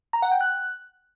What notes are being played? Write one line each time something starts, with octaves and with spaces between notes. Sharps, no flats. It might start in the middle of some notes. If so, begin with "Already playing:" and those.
A#5
F#5
G5
F#6